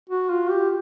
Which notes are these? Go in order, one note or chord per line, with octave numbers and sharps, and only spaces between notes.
F#4
F4
G4